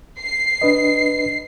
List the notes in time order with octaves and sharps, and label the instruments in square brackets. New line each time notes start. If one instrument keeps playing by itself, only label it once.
[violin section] C7
[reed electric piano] D4 B4 D#5